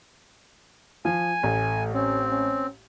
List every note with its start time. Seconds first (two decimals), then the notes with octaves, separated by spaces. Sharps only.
1.05 F3 G#5
1.43 A1 A3
1.95 C4 C#4
2.29 C#4